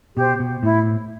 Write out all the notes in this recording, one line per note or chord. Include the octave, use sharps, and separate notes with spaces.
B2 G4 C5
B2
A2 E4